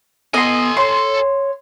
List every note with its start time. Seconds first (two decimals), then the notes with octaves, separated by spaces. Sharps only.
0.34 B3 A4 D#5 G#5 C6
0.77 C#5 C6